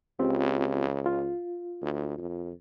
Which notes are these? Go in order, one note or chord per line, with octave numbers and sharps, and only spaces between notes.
C#2 C4 F4 G4
F4
D2
F2